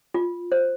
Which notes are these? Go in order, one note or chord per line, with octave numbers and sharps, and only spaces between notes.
F4
C5